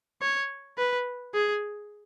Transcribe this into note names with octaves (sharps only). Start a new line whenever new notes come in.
C#5
B4
G#4